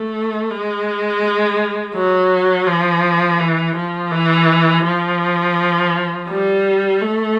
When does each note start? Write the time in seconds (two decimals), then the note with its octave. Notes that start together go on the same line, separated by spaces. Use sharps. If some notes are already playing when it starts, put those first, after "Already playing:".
Already playing: A3
0.50 G#3
1.95 F#3
2.67 F3
3.40 E3
3.76 F3
4.12 E3
4.85 F3
6.29 G3
7.01 A3